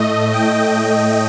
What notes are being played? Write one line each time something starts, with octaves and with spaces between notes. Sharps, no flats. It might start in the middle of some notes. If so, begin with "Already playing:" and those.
Already playing: A2 A3 D#5
G5
G5